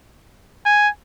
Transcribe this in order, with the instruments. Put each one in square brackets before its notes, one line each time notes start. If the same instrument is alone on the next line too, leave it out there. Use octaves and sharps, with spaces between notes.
[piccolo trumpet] G#5